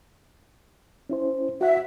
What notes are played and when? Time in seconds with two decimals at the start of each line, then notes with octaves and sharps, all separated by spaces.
1.09 C#4 E4 C5
1.61 F#4 E5 F#5